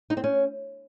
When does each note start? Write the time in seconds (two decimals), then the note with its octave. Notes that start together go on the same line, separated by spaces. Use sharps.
0.10 D#4
0.17 C4
0.24 C#4